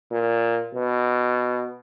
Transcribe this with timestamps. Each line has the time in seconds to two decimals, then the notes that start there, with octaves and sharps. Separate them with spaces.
0.11 A#2
0.74 B2